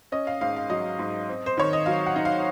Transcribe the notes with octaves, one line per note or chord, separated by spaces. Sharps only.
C#4 D#5
F5
G#2 F5
F5
F#3 D#5
G#2
C4
C5
D#3 C#5
D#5
F#3 F5
F#5
D#4
F5